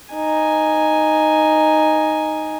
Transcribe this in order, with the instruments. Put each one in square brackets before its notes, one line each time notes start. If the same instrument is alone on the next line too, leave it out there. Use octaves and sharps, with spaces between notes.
[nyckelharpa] D#4 G#5